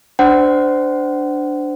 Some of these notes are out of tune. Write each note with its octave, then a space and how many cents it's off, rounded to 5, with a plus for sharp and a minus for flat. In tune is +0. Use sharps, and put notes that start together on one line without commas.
D4 +0 C5 -20 F#5 +30